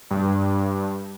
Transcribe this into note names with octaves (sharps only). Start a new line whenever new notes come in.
G2